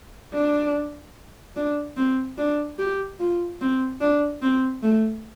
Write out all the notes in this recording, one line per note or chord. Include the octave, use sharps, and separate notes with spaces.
D4
D4
C4
D4
G4
F4
C4
D4
C4
A3